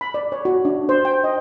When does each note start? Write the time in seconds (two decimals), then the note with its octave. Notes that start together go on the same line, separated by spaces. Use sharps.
0.01 B5
0.14 D5
0.32 C#5
0.45 F#4
0.65 D4
0.89 C5
1.05 G5
1.24 D#5